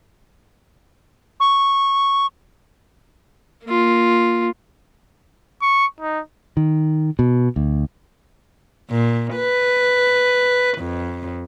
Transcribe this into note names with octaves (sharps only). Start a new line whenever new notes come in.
C#6
A#3 F4
C#6
D#4
D#3
B2
D2
A#2
B4
F2